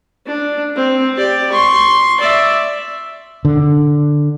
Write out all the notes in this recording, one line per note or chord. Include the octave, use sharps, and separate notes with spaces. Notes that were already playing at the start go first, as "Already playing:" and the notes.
D4
C4
G4 D5
C6 C#6
D5 E5
D3